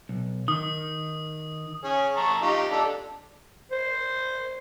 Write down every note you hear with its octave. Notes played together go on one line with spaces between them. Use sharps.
B1
D#3 D#6
C#4 G#4
A5 A#5 C#6
D#4 F4 G4
D4 G4 A4
C5